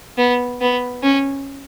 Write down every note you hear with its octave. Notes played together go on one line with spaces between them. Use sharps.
B3
B3
C#4